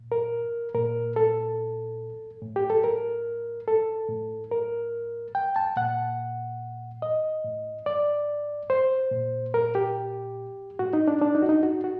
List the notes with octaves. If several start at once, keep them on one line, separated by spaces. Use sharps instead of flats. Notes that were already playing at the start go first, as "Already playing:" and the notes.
Already playing: A#2
A#4
A#2 A#4
A4
A2
G4
A4
A#4
A4
A2
A#4
G5
A5
A#2 F#5
D#5
A2
D5
C5
A#2
A#4
G4
A2 F#4
D#4
D4
D4
D#4
F#4
D#4
F#4
F#4